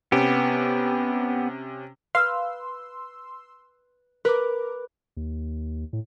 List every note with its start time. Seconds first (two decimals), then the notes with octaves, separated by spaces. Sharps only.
0.12 C3 B3 C#4 G4
2.15 B4 F5 C6 E6
4.25 A#4 B4 D6
5.17 D#2
5.93 A2